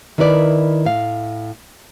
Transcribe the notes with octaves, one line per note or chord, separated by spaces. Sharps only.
D#3 E4 A#4 B4 D5
A2 F5